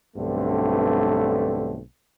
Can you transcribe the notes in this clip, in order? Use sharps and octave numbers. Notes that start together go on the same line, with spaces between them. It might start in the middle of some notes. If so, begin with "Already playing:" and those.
B1 G2 D3 A3 C4